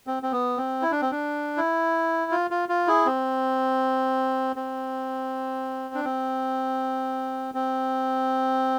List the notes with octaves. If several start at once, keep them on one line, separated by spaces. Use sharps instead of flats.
C4
C4
B3
C4
E4
D4
C4
D4
E4
F4
F4
F4
E4 G#4
C4
C4
D4
C4
C4